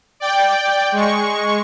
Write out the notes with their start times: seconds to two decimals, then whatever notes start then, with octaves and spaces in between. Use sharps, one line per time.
0.20 D5 G5
0.92 G#3 C#6